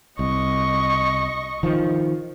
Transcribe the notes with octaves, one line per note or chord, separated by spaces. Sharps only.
C2 D#5 C#6
D#3 F3